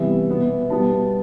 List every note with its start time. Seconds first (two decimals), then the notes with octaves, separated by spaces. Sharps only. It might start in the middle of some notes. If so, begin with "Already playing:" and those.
Already playing: C3 E3 G3 B3 E5
0.28 B2 B3
0.70 B2 G3 B3 A5